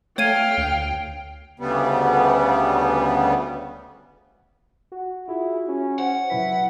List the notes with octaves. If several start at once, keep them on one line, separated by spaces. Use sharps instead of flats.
A3 C#5 F5 G5 G#6 D#7
D2
D2 C#3 G3 B3
F#4
E4 F4 G#4
C#4
C5 F#5
C3 F#3 E4 B4 B6